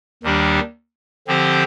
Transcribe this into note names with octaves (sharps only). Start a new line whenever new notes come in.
D#2 D#3 G3 D4 G4
D3 F3 C4 G4 C5